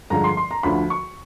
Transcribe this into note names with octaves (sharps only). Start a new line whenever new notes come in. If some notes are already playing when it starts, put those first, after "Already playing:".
G2 D3 F3 G#3 A#5
C6
C6
A#5
D2 D3 F3 B5
C#6